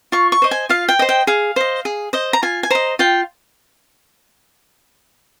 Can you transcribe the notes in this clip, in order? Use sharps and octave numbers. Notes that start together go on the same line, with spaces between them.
F4 C#6
C#6
C5 D#5
G#5
F4 F5
G5
C5 D#5
G5
G#4 F5
C5 D#5
G#4
C5 D#5
A#5
F4 G#5
G#5
C5 D#5 A#5
F4 G5